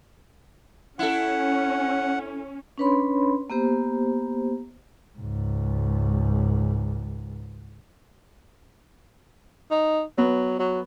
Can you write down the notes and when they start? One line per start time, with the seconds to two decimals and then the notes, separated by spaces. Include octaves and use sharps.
0.99 C#4 E4 A4 F#5
2.78 C#4 D4 B4 C#5 B5 C6
3.50 A#3 B3 G4 C5
5.17 C#2 G#2
9.71 D#4
10.18 F#3 B3
10.59 F#3